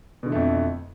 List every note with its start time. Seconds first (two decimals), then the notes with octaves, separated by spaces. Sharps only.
0.23 B2
0.26 D3
0.29 E3
0.32 A3
0.35 F2